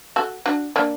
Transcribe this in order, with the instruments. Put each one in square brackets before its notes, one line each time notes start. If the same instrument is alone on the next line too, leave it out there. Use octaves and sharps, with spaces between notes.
[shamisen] F#4 A4
D4 F#4
A#3 D4